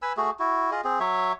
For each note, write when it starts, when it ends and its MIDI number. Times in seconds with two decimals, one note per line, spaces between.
0.02 0.13 71
0.02 0.13 80
0.02 0.13 83
0.02 0.13 88
0.17 0.30 57
0.17 0.30 66
0.17 0.30 68
0.39 0.70 64
0.39 0.70 66
0.71 0.81 65
0.71 0.81 68
0.71 0.81 75
0.84 0.99 60
0.84 0.99 68
1.00 1.33 54
1.00 1.33 73
1.00 1.33 76